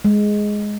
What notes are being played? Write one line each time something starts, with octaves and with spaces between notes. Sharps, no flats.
G#3